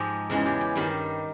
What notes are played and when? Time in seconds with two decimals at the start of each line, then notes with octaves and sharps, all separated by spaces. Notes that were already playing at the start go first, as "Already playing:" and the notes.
Already playing: G#2 F3 G#3 G4
0.30 E2 C#3 E3 G#3
0.46 G4
0.61 G4
0.76 G2 D#3 G3